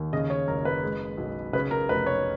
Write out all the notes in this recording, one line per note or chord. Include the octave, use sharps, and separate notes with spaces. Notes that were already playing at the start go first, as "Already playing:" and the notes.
Already playing: D#2
C#3 D#5
C#5
F#1 A#4
B4
G#3
B1
C#3 B4
A#4
F1 B4
C#5